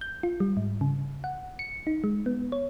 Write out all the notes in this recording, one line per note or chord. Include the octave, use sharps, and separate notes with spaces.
G6
F4
G3
G#2
C#3
F#5
C#7
D#4
G#3
B3
C#5